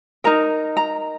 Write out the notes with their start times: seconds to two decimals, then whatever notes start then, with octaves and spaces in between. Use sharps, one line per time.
0.24 D#4 A#4 A#5
0.77 A#5